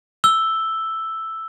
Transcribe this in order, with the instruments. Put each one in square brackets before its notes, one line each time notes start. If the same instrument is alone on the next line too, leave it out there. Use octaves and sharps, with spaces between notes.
[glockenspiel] E6 G7